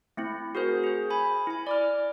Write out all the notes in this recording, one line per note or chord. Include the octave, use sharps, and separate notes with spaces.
A3 C4 E4
F#4 G#4 A#4 C5
G#4 C5
G#5 B5
E4 G#5
D5 D6 F6